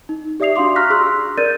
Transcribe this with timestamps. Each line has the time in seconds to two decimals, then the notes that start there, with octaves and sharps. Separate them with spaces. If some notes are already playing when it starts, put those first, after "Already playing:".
0.09 D#4
0.40 G4 D5 E5 D#6 C7 F7
0.56 D4 F#4 F5 C6 D6
0.76 A#5 C#6 F6 F#6 A#6 B6
0.90 G#4 C6 E6 F#6
1.38 A#4 D5 G6 A6 D#7